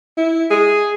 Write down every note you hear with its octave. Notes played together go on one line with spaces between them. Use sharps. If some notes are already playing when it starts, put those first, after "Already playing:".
E4
G#4